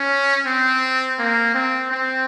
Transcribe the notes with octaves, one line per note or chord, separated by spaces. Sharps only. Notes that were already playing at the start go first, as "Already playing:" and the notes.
Already playing: C#4
C4
A#3
C4
C4